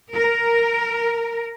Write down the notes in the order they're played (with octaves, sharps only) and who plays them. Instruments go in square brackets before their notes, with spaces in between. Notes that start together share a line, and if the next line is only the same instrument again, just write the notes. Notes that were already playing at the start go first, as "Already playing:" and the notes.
[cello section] A#4